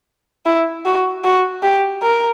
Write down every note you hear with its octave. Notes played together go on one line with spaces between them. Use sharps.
E4
F#4
F#4
G4
A#4